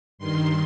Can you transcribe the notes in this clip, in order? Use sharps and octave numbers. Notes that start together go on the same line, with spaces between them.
G2 D#3 C6